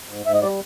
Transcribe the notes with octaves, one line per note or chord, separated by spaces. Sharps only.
G#2
G#2 E5
D#5
G3 D5